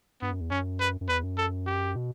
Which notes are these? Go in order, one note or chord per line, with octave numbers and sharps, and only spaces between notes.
G2 B3
F#2
E2
F#2 C#4
B4
F#2
E2 B4
F#2
A4
G4
B2